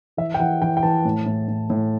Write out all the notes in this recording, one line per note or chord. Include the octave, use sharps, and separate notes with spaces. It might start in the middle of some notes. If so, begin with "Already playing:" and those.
E3 E5
G5
E3 F#5
E3 G5
G5
E3 A5
A2
A2
A2
A2